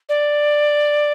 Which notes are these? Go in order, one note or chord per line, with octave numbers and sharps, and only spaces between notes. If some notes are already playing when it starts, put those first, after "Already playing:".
D5